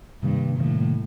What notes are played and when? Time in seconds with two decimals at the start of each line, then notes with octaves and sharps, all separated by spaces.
0.23 G2 C3 D#3 G3 A#3
0.59 A2 C3 D#3 G3 A#3